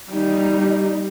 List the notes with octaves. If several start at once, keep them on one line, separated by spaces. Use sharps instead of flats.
G3 D#4